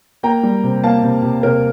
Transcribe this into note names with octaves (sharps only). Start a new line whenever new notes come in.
A#3 G5 A#5
G3
C3
A#3 F5 A5
C3
C3
C3 A#4